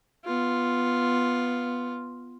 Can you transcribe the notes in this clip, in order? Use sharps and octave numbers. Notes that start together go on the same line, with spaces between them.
B3 F4